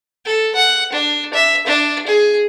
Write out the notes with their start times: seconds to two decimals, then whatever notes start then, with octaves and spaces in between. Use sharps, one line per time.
0.25 A4
0.55 F#5
0.92 D4
1.33 E5
1.66 D4
2.07 G#4